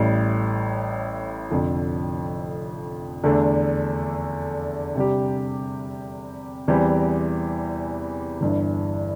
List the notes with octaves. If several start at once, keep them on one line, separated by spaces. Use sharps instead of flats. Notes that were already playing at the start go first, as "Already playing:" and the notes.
Already playing: A1 A2 G3
F1 F2 D3 F3
E2 D3 A3 D4
C3 G3 D4 G4
E2 E3 G3 C4 G4
G1 G2 E3